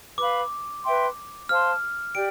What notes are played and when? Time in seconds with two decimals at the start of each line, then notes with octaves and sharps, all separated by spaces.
0.18 B4 F5 B5 D6
0.84 B4 E5 G5 C6
1.49 C5 F5 A5 C6 F6
2.15 G4 D5 G5 D7